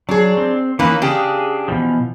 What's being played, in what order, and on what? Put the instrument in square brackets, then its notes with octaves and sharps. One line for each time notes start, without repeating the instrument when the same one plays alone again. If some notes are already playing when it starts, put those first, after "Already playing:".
[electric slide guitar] F#3 [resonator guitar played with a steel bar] D4 G#4
[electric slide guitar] C4
[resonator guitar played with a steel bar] D#3 A#3 C#4 [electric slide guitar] E3 B4
[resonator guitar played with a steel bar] C#3 G4 [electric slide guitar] D4 G#4
[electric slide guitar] B2 E3 F3